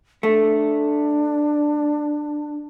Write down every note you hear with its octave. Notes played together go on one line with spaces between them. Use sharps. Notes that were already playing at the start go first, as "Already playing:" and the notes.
A3 D4